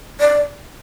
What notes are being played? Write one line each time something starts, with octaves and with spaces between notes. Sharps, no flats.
D5